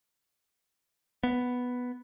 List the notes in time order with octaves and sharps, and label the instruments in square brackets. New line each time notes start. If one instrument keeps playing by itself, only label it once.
[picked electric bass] B3